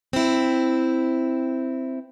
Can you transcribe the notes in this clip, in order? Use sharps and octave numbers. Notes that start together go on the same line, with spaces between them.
C4 E4